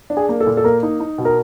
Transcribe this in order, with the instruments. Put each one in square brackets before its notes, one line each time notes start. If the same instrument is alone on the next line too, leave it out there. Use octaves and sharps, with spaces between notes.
[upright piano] D4
[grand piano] G#4
[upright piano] A#3
[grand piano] A4
[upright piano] A#2
[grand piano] A4
[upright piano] A#3 [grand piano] A#4
[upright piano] D#4
D#4
B2
[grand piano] A#4